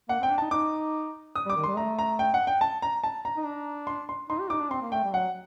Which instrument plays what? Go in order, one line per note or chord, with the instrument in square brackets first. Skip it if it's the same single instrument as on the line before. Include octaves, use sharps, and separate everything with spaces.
[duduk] A#3 [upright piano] F#5
[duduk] C4
[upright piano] G5
[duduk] D4
[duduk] D#4 [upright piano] A5
[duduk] D#4 [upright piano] D6
[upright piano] D#6
[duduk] G3
[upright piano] D6
[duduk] D#3
[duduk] G3 [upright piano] C6
[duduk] A3 [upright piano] A#5
[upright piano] A#5
G5
F#5
G5
A5
A#5
A5
A#5
[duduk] D#4
D4
[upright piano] C6
C6
[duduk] D#4 [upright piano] C6
[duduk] G4
[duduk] D#4 [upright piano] D6
[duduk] D4
[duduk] C4 [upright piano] C6
[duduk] A#3
[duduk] A3 [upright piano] G5
[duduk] G3
[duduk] F#3 [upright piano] F#5